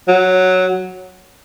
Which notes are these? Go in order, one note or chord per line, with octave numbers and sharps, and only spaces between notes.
F#3